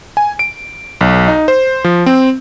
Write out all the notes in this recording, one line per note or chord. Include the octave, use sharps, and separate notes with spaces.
G#5
D7
B1
D#4
C5
F3
C4